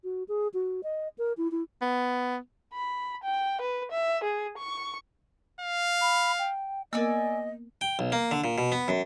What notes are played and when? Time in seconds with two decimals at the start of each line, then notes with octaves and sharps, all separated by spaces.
0.04 F#4
0.28 G#4
0.54 F#4
0.83 D#5
1.18 A#4
1.37 E4
1.51 E4
1.82 B3
2.73 B5
3.24 G5
3.61 B4
3.92 E5
4.24 G#4
4.58 C#6
5.61 F5
6.01 B5
6.38 G5
6.93 A#3 B3 A#4 D5 D#5 G#5 E6
7.81 G5
7.99 B1
8.12 A#3
8.31 D3
8.44 A#2
8.58 B2
8.72 B3
8.88 F#2